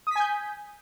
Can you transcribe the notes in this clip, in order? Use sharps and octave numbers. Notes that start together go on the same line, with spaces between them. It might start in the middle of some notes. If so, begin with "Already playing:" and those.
G#5 D#6 G6 B6